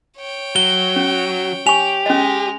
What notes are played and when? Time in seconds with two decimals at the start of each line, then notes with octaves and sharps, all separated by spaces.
0.17 C#5 G5
0.56 F#3 G7
0.96 C#4
1.67 G4 G#5 C#6 F7
2.06 G#3 C#4 D#5